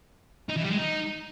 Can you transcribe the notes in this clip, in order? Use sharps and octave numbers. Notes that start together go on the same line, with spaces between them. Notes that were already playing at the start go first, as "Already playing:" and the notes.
D#4
E3
G3
G#3
D#4